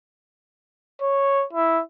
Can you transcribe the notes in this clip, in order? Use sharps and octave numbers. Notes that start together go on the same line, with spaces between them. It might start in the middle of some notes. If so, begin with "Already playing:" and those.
C#5
E4